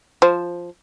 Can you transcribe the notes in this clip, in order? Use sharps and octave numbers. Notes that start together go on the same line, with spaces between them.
F3 C5